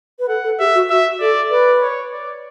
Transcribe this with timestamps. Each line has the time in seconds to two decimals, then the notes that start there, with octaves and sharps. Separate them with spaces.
0.19 B4
0.28 A4 F#5
0.44 A4
0.59 G4 E5
0.75 F#4
0.90 F#4 E5
1.20 A4 D5
1.50 B4 D5
1.81 C#5
2.12 D5